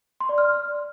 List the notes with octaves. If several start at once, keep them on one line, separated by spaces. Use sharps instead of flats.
C6
D5
F6